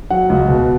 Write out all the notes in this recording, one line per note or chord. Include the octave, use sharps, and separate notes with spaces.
F#3 F#5
C#2
B2